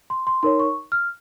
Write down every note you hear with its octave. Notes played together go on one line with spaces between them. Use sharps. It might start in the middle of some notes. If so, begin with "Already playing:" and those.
C6
C6
D#4 A#4 C#5 C6
C#6
F6